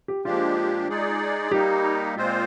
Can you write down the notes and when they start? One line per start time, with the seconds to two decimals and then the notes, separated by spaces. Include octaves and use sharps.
0.08 G4
0.25 A#2 F3 G#3 D4 F4 G4
0.89 G#3 D#4 G#4 D5
1.51 G3 A#3 D#4 G4
2.15 A#2 G#3 C4 F4 C5